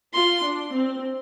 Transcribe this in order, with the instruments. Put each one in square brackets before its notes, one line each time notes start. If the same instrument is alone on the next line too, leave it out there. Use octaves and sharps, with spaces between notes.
[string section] F4 [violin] C6
[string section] D4
C4